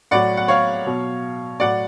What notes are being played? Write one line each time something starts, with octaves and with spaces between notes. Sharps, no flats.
A2 F#3 D5 F#5
F#5
C#5 F5
B2 F#3
A2 F#3 D5 F#5